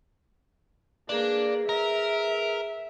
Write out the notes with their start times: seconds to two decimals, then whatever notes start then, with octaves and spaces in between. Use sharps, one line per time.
1.09 A#3 D4 G#4 B4
1.69 A#4 E5